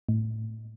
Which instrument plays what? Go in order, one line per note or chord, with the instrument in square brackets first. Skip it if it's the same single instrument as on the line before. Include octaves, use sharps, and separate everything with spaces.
[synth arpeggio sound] A2